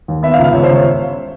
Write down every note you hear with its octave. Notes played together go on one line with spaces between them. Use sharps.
D#2
B3 E5
F5
C#2
F5
C#2 C#5
C#2 C5
C#5